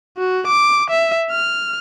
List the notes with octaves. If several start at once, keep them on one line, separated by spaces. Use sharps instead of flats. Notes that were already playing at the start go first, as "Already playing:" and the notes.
F#4
D6
E5
F6